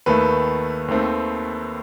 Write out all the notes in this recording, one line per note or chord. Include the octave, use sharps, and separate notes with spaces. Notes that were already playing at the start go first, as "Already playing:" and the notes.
D#2 D#3 A3 B4
D#2 D#3 A3 C4